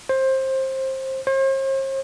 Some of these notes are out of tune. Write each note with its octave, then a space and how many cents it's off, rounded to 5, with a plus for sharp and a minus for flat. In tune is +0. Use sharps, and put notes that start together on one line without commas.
C5 +20
C5 +45